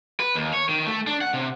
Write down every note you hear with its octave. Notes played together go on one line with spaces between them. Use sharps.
B4
D#2
C#5
D#3
A3
D4
F#5
C3